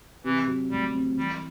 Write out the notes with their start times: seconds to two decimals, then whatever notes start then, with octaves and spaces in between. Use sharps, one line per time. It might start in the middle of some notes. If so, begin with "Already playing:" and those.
0.24 C3 E3
0.48 F#3
0.70 D2 G3
0.94 C4
1.17 E3 G3